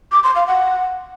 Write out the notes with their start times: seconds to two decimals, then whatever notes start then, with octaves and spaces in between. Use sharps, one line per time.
0.12 D6
0.24 C6
0.36 F5
0.47 F#5